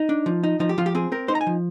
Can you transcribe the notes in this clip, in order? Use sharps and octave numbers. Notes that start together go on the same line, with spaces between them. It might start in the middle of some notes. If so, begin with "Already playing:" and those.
Already playing: D#4
D4
F3
D#4
F3 D#4
G4
F3 F4
G4
C4 G#4
C4 A#4
D#4 C5
A#5
G#5
F3